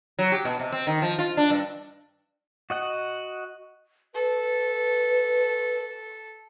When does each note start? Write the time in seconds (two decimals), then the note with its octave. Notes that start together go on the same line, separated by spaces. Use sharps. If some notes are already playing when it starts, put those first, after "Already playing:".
0.19 F#3
0.32 G4
0.45 B2
0.60 C3
0.72 C4
0.87 D#3
1.02 F3
1.19 F4
1.37 D4
1.50 G2
2.70 F#4 D#5 F#5
4.15 A4 B4